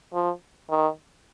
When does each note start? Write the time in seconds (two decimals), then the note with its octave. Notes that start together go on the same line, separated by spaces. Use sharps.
0.13 F3
0.70 D#3